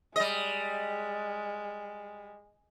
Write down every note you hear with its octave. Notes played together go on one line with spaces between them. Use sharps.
G3 G#3 D#5